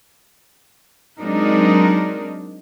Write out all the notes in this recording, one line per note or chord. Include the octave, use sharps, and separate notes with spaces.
F#3 G#3 C4 D4 D#4 A#4